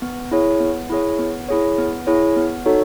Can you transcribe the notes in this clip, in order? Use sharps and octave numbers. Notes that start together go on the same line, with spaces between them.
B3
E4 G#4 C#5
B3
E4 G#4 C#5
B3
E4 G#4 C#5
B3
E4 G#4 C#5
B3
D#4 F#4 A4 C#5